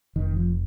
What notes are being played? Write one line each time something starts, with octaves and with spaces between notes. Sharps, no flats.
F1 D#3
F3